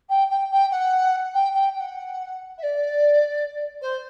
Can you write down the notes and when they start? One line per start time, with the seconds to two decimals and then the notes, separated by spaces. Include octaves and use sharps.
0.09 G5
0.30 G5
0.51 G5
0.71 F#5
1.34 G5
1.54 G5
1.75 G5
1.80 F#5
2.58 E5
2.63 D5
3.82 C5